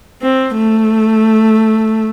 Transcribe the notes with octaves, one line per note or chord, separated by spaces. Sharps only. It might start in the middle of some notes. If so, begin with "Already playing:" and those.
C4
A3